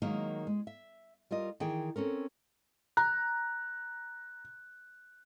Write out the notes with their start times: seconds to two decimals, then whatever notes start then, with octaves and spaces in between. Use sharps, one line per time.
0.02 D#3 F#3 G#3 A#3 D#4
0.47 G#3
0.67 E5
1.31 G3 F4 A#4 D#5
1.60 D#3 E3 G#4 G5
1.96 C4 C#4 A4 A#4
2.97 A#5 F#6